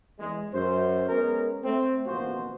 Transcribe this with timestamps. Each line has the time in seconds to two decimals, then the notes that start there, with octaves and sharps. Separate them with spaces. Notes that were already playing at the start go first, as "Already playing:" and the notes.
0.20 E2 G#3
0.54 F#2 C5
1.09 G#3 B3 C#4 A#4
1.64 A3 C4
2.06 A1 D#2 B2 F3 F#4 C5